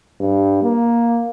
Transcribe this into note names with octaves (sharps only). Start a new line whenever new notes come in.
G2
A#3